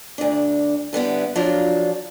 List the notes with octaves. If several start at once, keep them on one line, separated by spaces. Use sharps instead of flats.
D2 D4
D3 G3 B3 E4
F3 F#3 D4 F4